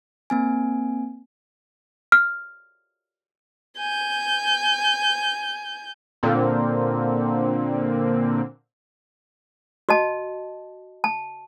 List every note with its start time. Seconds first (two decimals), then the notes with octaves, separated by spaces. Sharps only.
0.30 A#3 C4 G#5
2.12 F6
3.77 G#5 G6
6.23 A#2 D3 A#3 C4
9.89 F#4 D#5 A5
11.04 A5